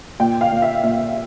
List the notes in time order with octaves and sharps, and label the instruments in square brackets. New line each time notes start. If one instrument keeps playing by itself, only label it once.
[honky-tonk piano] A#2 G5
F5
A#2
E5
A#2 E5